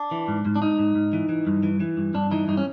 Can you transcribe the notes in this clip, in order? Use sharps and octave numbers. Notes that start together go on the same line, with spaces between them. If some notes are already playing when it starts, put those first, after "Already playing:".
Already playing: D4
E3
G#2
G#2
D4
G#2 D#4
G#2
G#2
E3
E3
G2
E3
E3
G2
G2 D4
E3 D#4
G2 D#4
C#4